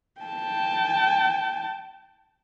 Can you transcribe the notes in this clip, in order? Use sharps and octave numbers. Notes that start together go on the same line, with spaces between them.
G5 A5